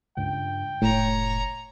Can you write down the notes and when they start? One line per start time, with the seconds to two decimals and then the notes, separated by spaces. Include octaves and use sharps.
0.17 C#2 G2 G5
0.82 F1 A2 C#5 A#5